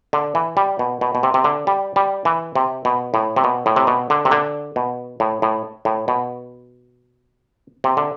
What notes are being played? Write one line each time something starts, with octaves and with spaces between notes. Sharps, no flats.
D3
E3
G3
B2
B2
B2
C3
C3
D3
G3
G3
E3
C3
B2
A2
C3
B2
A2
C3
B2
D3
C3
D3
B2
A2
A2
A2
B2
C3
D3